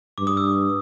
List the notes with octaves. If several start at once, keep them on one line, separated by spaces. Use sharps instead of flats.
G2 D6
D#6
E6